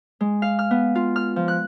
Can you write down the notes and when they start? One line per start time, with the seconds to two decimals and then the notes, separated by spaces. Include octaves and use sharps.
0.21 G#3
0.42 F5
0.59 F6
0.71 B3
0.95 F4
1.16 F6
1.36 F3
1.48 F#6